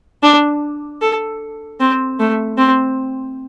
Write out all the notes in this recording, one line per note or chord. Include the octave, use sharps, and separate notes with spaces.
D4
A4
C4
A3
C4